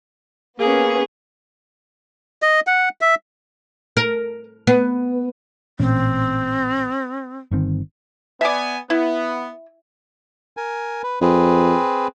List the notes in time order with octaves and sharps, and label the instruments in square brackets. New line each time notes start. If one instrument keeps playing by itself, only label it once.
[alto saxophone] A#3 [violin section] B3 C#4 [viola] G#4
[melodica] D#5
F#5
E5
[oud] A#4
B3
[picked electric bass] A1 A#2 C#4 [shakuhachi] C4
[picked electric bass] G1 D#3 C4
[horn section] B3 G#5 [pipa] D5 E5
[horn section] B3 [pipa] E4
[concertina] A#4 G#5
B4
[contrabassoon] F2 [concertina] C4 G#4 B4